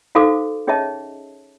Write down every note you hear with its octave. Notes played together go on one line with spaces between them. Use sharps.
D#4 F#4 A4 C5 F5 D6
C#4 G#4 C#5 D#5 E5 A5